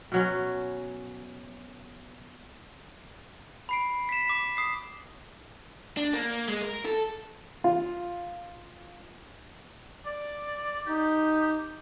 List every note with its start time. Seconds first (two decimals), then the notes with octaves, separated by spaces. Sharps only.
0.12 B2 F#3 C#4
3.69 B5 C7 D7
4.09 B6 E7
4.29 D6
4.57 D#6 C7
5.97 D4
6.13 A#3
6.48 G#3
6.62 A#4
6.85 A4
7.64 F4
10.06 D5
10.87 D#4 G4